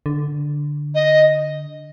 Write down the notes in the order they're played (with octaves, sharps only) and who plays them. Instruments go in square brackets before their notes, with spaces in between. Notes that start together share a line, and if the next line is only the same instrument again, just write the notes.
[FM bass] D3
[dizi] D#5